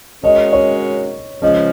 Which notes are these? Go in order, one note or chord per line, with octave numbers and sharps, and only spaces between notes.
G#3 C#4 F#4 A#4 D#5
C#5
C#3 F3 G#3 C#4 D#5